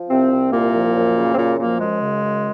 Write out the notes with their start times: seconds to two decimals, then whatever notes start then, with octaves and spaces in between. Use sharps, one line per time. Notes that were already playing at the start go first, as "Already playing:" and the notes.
Already playing: F3
0.09 C2 C3 C4
0.31 C3
0.52 C2 A#2 A#3
0.74 F3
0.95 F#2
1.16 C#3
1.33 C4
1.37 F#2 A#2 A#3
1.59 A#2 F3 A#3
1.80 F#2 G#3
2.01 C#3
2.23 F#2